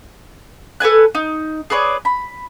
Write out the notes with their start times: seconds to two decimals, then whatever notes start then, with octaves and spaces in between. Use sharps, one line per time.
0.80 A4 B4 G#5 F#6
1.15 D#4
1.70 G#4 B4 C#5 D5
2.05 B5